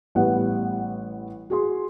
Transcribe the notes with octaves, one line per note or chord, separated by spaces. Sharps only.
A1 G3 B3 F#5
F#4 G#4 C6